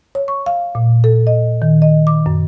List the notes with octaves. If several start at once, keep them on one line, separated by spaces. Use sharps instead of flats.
C#5
C#6
F5
A#2
A4
D#5
D#3
D#5
D6
F#2